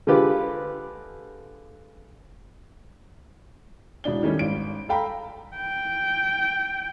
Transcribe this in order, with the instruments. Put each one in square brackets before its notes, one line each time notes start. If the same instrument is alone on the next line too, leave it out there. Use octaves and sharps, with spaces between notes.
[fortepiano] D3 G#3 F4 G4 B4
[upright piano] E1 A2 D4 G7
D#3 G3 A3 C#4
G#1 D7
A4 F5 G5 A#5 B5
[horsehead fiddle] G5